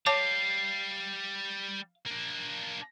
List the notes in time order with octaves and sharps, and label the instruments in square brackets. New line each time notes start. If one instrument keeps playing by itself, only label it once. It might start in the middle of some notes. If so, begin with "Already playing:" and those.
[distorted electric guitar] G3 [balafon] C#5 A5 D6 [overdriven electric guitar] F5
[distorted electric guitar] A#3 D4